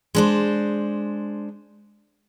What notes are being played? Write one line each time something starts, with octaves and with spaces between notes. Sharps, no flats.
G#3 D4 C5